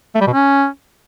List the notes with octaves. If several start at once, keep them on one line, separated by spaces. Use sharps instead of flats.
A3
G3
B2
C#4